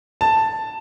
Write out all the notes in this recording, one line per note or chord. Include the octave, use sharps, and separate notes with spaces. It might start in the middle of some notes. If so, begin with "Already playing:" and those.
A5